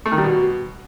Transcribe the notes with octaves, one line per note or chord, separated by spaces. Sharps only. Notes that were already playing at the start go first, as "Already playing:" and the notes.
A3
D#3
G3
B2